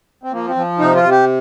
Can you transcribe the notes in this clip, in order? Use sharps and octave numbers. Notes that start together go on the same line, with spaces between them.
C4
F3 A#3
C4
F3
C3 D#4
F4
C3
G4